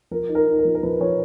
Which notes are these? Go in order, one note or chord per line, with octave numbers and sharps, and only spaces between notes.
F3 A#4
D#4
A#4
D#4
A#4
F3
A#4
F3 B4
F3 C#5